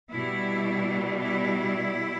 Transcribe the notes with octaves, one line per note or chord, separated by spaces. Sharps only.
B2 G3 E4
E4